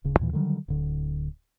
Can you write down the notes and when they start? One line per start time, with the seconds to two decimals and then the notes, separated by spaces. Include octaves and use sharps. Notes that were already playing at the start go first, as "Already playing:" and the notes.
0.04 D1 C#3
0.19 D#2 A#2 E3
0.33 D3 D#3 F#3 G3
0.68 D1 D3